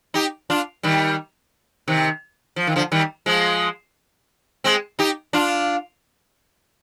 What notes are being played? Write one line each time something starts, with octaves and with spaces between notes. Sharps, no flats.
D#4 G4
D4 F4
D#3 G3
C3 D#3
F3
D#3
D3 F3
D#3 G3
F3 G#3
G#3 C4
D#4 G4
D4 F4